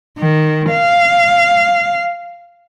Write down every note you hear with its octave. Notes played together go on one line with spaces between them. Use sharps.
D#3
F5